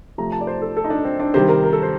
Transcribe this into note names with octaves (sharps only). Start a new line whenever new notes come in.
C3 F3 A3 A#5
A5
D5
C5
A4
A4
D#4
D4
C4
D4
C3 D#3 G3 C5
A#4
A#4
A4
C5